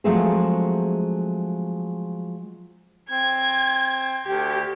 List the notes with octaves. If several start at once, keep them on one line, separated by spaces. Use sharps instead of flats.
F3 F#3 G#3 A3 C4 G#4
C4 G#6
D2 G4